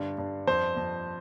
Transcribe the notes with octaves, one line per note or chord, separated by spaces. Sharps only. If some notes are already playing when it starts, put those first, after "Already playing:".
Already playing: G2 D3
G2
F2 C5
F2